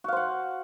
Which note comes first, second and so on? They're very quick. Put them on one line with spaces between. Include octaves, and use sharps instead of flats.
F#4 F5 C5 F#5